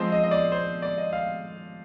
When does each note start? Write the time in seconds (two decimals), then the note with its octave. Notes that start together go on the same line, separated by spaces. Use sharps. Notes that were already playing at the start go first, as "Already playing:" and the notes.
Already playing: F3 G#3 C4 C5
0.12 D#5
0.24 D#5
0.31 D5
0.52 C5
0.82 D5
0.98 D#5
1.13 F5